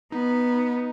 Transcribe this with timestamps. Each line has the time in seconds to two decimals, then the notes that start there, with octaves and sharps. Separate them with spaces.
0.12 B3 D#4